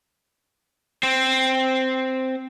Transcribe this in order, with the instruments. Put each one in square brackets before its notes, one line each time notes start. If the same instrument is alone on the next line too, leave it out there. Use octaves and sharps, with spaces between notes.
[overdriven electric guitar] C4 C5